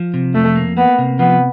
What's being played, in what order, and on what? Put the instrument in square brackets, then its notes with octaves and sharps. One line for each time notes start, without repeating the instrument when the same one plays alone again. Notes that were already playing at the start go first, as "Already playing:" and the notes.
Already playing: [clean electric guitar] F3
C3
[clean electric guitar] F2 [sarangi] A3
[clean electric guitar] A#3
[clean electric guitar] A#3 [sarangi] B3
[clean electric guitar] C3
[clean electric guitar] F3 [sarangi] B3